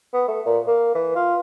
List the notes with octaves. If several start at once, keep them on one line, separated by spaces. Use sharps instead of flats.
B3
A3
A#2
A#3
E3
F4